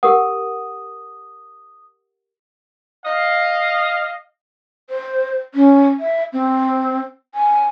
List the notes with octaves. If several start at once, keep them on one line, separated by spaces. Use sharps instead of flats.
G4 A#4 F#5 D#6
D#5 F5
C5
C#4
E5
C4
G#5